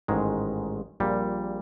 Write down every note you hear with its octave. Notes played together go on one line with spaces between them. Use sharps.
A1 G#2 D#3 G#3
A#1 A#2 G3 C4